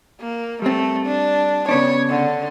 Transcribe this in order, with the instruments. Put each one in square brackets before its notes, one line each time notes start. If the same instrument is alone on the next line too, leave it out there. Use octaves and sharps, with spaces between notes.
[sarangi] A#3
[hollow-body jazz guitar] G3 C4 [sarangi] A3
[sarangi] D4
[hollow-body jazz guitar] C#3 B3 D4 [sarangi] C#5
[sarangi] D3